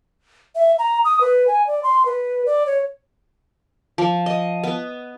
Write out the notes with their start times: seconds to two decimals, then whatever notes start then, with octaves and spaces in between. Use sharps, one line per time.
0.55 E5
0.79 A#5
1.05 D#6
1.21 B4
1.48 G#5
1.67 D5
1.83 C6
2.06 B4
2.46 D5
2.67 C#5
3.98 F3
4.26 D#5
4.64 B3